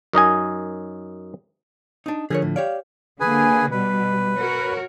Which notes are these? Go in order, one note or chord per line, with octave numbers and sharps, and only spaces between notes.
F#2 D#4 D#5 G#5
D4 D#4
D3 F3 G#4 A#4 C#5
A2
G4 C#5 D5 F5
D3 A#3 G#4 B4 G#5
B2 G3 B4
F#4 A#4 C#5